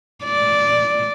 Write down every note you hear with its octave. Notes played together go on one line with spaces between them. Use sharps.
D5